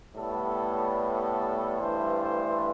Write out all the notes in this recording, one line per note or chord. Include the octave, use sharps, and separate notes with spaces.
A2 G3 B3 A4
A4
G2 E3 A3 C5
C5